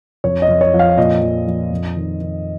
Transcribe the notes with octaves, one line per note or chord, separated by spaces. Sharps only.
F2 C#5
D#5
F2
C#5
F3
F5
A#2 D#5
F3
F3
F2
D#3
D#3